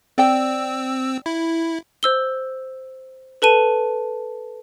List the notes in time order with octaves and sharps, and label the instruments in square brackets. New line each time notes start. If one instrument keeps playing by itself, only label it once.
[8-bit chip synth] C4 E6 [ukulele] D5 G5
[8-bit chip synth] E4
[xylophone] C5 E6 G7
A4 B4 A5 D#7